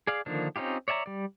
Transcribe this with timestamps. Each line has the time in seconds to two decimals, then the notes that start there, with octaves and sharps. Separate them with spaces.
0.07 G#4 D5 F5
0.26 D3 D#3 F3 A#3 D4
0.56 C4 C#4 D#4 F4 G4
0.88 C#5 D5 E5 G#5 A#5
1.06 G3 D5